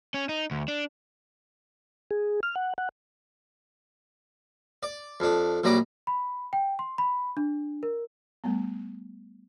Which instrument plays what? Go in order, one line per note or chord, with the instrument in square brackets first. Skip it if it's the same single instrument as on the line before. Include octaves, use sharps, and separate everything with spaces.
[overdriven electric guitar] C#4
D#4
D2
D4
[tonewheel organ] G#4
F6
F#5
F#5
[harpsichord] D5
F2 D4
A#1 F#3 G3 A#5 D6
[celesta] B5
G5
C6
B5
D4
A#4
[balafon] G3 A3 B3